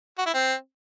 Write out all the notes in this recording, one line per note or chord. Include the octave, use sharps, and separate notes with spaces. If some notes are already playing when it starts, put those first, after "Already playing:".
F#4
E4
C4